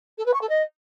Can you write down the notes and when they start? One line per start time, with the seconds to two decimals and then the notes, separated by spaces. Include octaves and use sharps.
0.18 A4
0.25 B4
0.33 C#6
0.41 A4
0.49 D#5